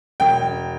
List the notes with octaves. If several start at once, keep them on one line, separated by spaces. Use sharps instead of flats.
E1 G5